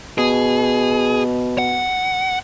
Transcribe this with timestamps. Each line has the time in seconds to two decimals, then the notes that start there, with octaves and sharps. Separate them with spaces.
0.18 B2 G#4
1.58 F#5